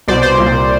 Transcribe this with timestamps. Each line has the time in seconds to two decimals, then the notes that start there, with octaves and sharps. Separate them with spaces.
0.08 C2 B2 C5 D5
0.22 C5 D5
0.37 C2 A#2